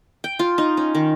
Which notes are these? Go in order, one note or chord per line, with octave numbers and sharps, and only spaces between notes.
G5
F4
D#4
C#4
D#3